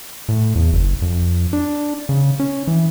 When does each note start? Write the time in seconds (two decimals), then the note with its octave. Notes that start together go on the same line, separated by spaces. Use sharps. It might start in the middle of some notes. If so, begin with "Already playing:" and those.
0.29 A2
0.56 E2
0.73 F#1
1.02 F2
1.53 D4
2.09 C#3
2.40 C#4
2.67 E3